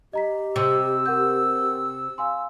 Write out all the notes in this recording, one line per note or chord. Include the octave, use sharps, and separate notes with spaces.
G4 D#5 A#5 B6
C3 E6
A#4 F#5 G6
F5 G#5 C6